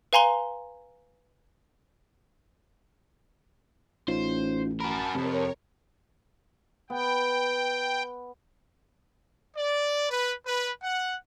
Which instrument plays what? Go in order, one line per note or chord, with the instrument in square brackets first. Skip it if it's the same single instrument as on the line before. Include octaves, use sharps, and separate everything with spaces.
[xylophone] B4 F5 G#5 A#5 C6 G7
[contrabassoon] A1 [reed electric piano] C#4 D#4 F4 [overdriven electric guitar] C5
[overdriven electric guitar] F#4 A#4 [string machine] A5 [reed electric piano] B5
[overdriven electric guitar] F2 G#2 [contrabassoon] C3 [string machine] A#4 C#5
[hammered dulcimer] B3 [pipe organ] G5
[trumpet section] D5
B4
B4
F#5